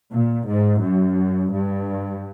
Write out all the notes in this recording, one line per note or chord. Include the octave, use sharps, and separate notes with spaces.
A#2
G#2
F#2
G2